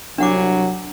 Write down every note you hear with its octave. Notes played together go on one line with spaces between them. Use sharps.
C2 F#3 D4 F#5 D6